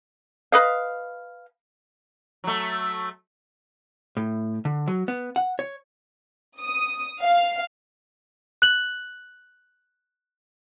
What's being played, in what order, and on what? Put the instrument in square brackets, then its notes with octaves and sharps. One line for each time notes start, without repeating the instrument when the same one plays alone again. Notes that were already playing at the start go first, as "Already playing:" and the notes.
[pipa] B4 D#5 F5
[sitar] F#3 A3
[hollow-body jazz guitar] A2
D3
F#3
B3
F#5
C#5
[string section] D#6
F5
[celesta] F#6 F#7